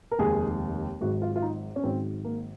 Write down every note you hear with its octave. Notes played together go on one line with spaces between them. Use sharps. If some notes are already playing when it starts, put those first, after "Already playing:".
A#4
F1 D#2 D#3 G#3 G#4
G#1 G#2 F#3 F#4
F4
F4
D#4
C#4
G#1 G#2 F#3 C4
A#3